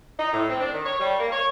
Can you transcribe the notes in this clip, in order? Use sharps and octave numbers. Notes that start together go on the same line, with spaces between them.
D#4
A2
C4
D4
D#3
C#5
G3
A#3
C#5